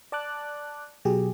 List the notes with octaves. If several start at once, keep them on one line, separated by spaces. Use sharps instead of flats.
D5 A5 D6 F#6
B2 F#3 G4 G#4